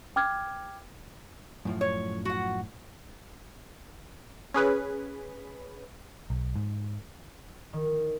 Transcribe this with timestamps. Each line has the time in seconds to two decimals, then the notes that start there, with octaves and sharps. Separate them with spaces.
0.16 G5 D6 F6 G#6
1.65 F#2 A2 F3
1.81 C#5
2.25 F#4 F#5
4.54 C#4 G#4 B4
6.30 B1
6.56 G#2
7.73 D#3